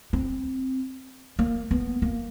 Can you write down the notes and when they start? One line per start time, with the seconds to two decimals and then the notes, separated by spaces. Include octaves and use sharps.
0.13 C4
1.39 A#3
1.71 B3
2.02 A#3